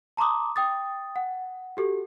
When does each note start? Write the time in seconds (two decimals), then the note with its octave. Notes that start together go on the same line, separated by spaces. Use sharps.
0.17 A5 A#5 C6 D6 D#6
0.56 G5 D#6 A6
1.16 F#5
1.77 F#4 G4 A4